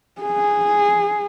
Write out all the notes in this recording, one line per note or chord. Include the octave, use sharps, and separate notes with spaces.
G#4